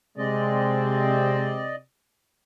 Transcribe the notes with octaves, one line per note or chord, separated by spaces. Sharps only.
C3 G#3 C4 D5 D#5